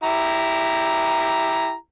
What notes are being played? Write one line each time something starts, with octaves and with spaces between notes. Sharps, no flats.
E4 G4 A#5